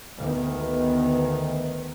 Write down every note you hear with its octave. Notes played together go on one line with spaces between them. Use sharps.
D2 D#3 B3